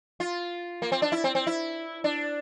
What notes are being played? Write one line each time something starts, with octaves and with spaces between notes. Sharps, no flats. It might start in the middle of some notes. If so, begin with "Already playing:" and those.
F4
A#3
C4
D4
E4
C4
C4
E4
D4